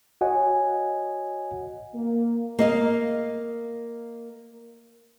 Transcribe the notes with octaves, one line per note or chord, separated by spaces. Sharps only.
F#4 C#5 D#5 F#5 G#5
A#3
A#3 D#5 F5